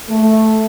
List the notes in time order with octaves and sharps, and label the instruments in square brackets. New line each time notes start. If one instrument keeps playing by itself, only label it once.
[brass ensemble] A3